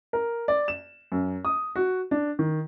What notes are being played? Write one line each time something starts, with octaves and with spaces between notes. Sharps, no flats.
A#4
D5
E7
F#2
D#6
F#4
D4
D#3